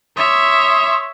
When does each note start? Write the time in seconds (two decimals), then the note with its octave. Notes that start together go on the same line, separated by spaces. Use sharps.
0.16 C#5 E5 C6 D#6